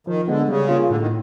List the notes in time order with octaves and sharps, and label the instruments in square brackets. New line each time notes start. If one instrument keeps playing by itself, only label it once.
[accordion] D#3 [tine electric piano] F3
[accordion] D3 [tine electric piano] G#3 B3
[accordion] C#3 [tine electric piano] G3
[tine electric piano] A#3 C#4 F4
[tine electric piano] A2 [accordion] D3
[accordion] D#3